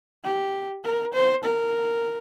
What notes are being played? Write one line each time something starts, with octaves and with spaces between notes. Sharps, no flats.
G4
A#4
C5
A#4